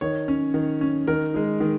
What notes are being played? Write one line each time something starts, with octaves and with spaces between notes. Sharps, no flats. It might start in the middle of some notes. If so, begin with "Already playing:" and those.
D#3 C#5
C#4
D#3
C#4
D#3 A#4
G#3 D#4
D#3